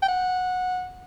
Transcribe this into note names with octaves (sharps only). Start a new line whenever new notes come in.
G5
F#5